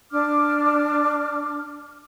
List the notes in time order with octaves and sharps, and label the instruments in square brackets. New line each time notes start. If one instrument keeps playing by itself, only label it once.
[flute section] D4 D6 F6